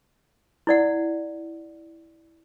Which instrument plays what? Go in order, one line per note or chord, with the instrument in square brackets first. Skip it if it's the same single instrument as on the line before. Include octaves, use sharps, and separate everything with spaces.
[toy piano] E4 D5 F#5